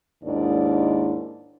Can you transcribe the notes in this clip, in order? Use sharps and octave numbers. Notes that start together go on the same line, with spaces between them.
D#2 G#2 D4 E4 D5